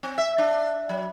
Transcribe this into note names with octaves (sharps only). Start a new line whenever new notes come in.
C4
E5
D4
F#3